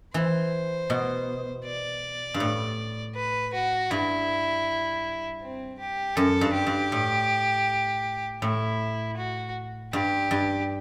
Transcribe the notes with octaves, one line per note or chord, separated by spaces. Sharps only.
E3 C5
B2
D5
G2
A2
B4
F#4
G2 E4
C4
G4
F#2 A4
G2
G4
G2
A2
A2 E4
F#4
G2 G4
G2